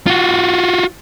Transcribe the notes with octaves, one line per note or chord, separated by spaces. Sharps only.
F4 F#4